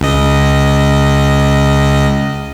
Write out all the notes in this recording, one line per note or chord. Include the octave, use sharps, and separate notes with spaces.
C#2 D#5